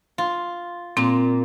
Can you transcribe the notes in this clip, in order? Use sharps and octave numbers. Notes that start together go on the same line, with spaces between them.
F4
A#2 C4